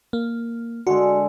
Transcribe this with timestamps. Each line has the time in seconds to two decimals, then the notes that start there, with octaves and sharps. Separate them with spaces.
0.13 A#3
0.87 D3 G#3 F#4